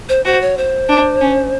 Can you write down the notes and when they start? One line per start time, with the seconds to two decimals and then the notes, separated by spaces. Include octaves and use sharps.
0.09 C5
0.25 F#4 C5
0.41 C#5
0.57 C5
0.89 D4
1.21 C#4